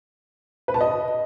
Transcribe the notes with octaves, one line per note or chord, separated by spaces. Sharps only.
B4
A5
D#5